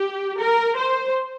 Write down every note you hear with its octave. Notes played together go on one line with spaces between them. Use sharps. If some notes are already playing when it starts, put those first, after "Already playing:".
Already playing: G4
A#4
C5